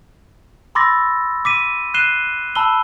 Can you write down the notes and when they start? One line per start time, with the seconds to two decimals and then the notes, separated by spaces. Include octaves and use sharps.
0.75 B5 C6 D6 E6 A6 A#6
1.45 D6 B6 D#7
1.94 F#6 C7 D#7 E7 G7
2.55 A5 B5 E6 G7